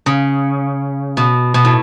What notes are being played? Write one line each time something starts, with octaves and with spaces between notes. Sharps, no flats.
C#3
B2
B2
A2